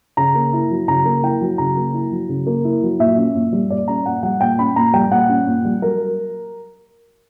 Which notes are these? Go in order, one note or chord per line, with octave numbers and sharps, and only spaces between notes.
C#3 A#5
A#3
E4
F#3
C#3 A#5
A#3
E4 G5
F#3
C#3 A#5
A#3
E4
F#3
C#3
A#3
E4
F#3
A#2 E5
C#4
A#2
G3
A#2 D5
C#4 A#5
A#2 F#5
G3 F#5
A#2 G5
C#4 B5
A#2 A#5
G3 G5
A#2 F#5
C#4
A#2
G3
F#3 A#4